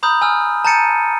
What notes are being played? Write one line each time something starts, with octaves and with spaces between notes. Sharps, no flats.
A#5 B5 D#6 F6 G6
G#5 E6 F6
A5 A#5 G6 A6 C#7 D#7